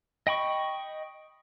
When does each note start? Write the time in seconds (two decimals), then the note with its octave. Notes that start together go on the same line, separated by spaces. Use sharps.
0.27 D#5 G5 B5 C#6